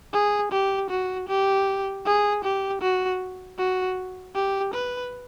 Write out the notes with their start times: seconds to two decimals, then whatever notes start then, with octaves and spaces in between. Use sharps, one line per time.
0.13 G#4
0.52 G4
0.90 F#4
1.28 G4
2.06 G#4
2.44 G4
2.81 F#4
3.58 F#4
4.35 G4
4.73 B4